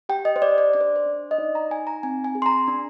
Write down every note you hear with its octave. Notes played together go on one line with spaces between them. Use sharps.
G4 G5
D#5
C5
G4 D5
D5
D4 D5
C5
C5
D4
D#5
D#4 D5
A#5
D#4 G#5
A#5
C4 G#5
G#5
G#4
C6
A#5
D4